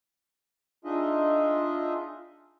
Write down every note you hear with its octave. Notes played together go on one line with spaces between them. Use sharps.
D4 D#4 F4 G#4 D#5 E5